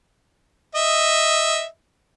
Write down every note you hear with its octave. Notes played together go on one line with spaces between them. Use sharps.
D#5 E5